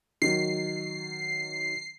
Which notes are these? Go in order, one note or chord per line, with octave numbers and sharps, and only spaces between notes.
D#3 F#3 C7